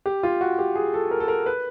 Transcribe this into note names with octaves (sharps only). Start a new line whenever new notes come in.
G4
F4
F#4
G4
G#4
A4
A#4
A4
A#4
B4